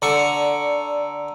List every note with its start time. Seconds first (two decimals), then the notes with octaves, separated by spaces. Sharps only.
0.02 D3 D5 A5 A#5 C#6 E6